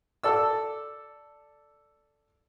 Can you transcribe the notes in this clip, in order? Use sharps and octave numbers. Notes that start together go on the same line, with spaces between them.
A4 D5 E6